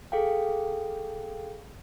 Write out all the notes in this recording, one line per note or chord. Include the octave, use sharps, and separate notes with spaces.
G#4 A4 F5 G5